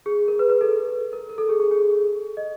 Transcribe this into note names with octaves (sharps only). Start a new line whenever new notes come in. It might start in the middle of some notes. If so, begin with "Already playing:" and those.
G#4
A#4
B4
B4
A4
A#4
A#4
A4
G#4
G#4
G#4
D#5